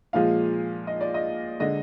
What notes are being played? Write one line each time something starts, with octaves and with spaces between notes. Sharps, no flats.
A#2 F3 G#3 F5
D#5
D5
D#5
D3 G#3 D#5